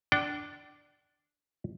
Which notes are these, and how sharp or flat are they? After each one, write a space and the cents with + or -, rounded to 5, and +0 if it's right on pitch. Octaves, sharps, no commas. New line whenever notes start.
D4 +0 G5 -45